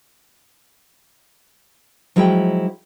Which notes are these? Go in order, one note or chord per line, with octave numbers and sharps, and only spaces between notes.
F3 F#3 G#3 E4 D5 G5